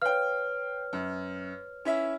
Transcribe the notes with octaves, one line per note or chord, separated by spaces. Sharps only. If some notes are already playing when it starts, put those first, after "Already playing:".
B4 C#5 F5 G5 F6
F#2
C#4 E4 E5